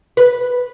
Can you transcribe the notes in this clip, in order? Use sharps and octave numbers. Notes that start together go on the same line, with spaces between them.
B4